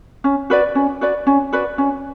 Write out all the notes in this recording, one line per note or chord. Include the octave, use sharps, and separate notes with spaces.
C#4
F#4 B4 D5
C#4
F#4 B4 D5
C#4
F#4 B4 D5
C#4